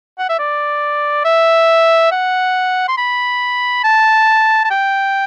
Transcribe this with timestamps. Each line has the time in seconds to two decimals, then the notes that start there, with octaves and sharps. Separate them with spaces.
0.19 F#5
0.29 E5
0.39 D5
1.25 E5
2.11 F#5
2.88 C6
2.98 B5
3.84 A5
4.64 A5
4.70 G5